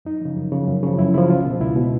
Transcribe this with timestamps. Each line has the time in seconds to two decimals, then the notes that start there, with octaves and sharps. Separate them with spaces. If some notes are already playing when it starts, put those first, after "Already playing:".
0.05 F#2 D#4
0.21 C#3 F3
0.37 F#2
0.52 C#3 F3
0.67 F#2
0.83 C#3 F3
0.99 F#2 E4
1.14 C#3 F3 E4
1.30 C#2 F4
1.45 B2
1.60 C#2 E4
1.76 B2